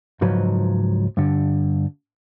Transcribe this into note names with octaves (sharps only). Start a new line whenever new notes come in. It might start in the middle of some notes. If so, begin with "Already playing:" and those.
C#2 G#2 F3 F#3 B4
G2 D3